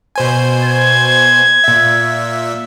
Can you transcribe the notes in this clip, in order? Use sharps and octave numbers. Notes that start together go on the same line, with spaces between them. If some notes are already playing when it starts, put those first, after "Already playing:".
B2 C5 G#5
G#6
A#2 E5